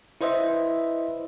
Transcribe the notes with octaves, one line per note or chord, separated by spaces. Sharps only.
E4 B4 C5 D#5 E5